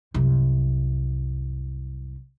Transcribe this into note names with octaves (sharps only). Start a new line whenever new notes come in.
C2 F#2